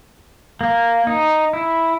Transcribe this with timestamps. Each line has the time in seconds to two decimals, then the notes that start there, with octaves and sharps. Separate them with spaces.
0.61 A#3
1.07 D#4
1.53 E4